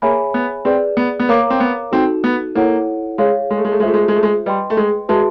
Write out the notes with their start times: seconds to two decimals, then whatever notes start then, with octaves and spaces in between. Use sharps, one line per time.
0.02 A#3 G#4 C#5 E5 G#5 B5
0.34 B3
0.65 C4 G#4 B4 D5
0.97 B3
1.20 B3
1.29 A#3 A#4 C#5 F5 A#5 D6
1.50 C4
1.60 B3
1.92 C4 D#4 F#4 A4
2.24 B3
2.55 A#3 E4 A4 C#5 F#5
3.18 G#3 G#4 C#5 F5
3.50 G#3
3.57 A3
3.65 G#3
3.72 A3
3.80 G#3
3.83 A3 F4 G#4 C5 E5
3.94 G#3
4.01 A3
4.08 G#3
4.16 A3
4.23 G#3
4.46 G3 B4 D#5 G5 C6
4.70 A3
4.77 G#3
5.09 G#3 F#4 B4 E5 A5 C6